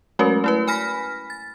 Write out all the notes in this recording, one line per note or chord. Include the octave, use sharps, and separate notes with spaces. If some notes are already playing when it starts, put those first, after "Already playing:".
F#3 G#3 A3 C#4 F#4 A#4
A3 E4 B4
G#5 B5 F6 A#6 B6
A6